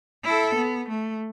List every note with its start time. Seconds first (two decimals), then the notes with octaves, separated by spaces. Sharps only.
0.24 E4 A4
0.55 B3
0.89 A3